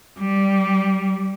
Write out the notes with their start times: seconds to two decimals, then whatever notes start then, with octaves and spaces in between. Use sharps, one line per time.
0.19 G3